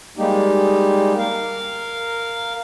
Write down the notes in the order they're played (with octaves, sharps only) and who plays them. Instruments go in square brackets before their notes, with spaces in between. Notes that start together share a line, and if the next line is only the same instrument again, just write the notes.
[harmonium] G3 G#3 A#3 D#4 G4
A#4 F5